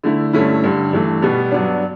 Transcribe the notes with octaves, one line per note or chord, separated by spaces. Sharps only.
D3 A3 E4
G2 D3 A3 C#4 E4
G2 D3 G3
G2 E3 A3
B2 G3 B3
G2 F#3 B3 D4